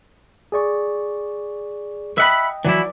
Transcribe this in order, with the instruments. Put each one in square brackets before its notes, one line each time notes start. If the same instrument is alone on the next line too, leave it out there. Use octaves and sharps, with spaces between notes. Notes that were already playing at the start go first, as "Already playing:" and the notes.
[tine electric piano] G#4 D5 C#6
[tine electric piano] D#5 G5 [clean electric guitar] E5 F#5 B5
[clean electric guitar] E3 F#3 E4 [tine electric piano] D5 D6